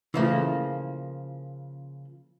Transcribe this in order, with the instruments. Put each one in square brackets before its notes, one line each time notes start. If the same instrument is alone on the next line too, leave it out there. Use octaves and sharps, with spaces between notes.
[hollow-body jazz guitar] C#3 F3 A#3 [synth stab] E3 A3